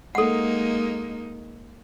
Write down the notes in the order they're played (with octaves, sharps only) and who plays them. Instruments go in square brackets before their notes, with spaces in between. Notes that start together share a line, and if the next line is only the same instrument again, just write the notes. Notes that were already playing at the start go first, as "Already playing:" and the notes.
[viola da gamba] G#3 A#3 D#4 [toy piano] A4 F#5